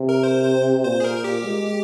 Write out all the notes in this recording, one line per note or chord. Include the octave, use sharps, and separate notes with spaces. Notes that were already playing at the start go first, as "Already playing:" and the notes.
Already playing: C3
A#4
C5
C5
A#2 C5
G#4
A#4
G4
G#3